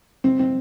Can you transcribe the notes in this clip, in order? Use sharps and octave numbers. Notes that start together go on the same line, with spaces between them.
C3 C4
C4